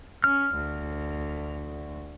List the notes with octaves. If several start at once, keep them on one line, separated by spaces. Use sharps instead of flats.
C#4 F6
D2